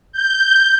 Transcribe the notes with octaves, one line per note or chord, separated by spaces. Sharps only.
G6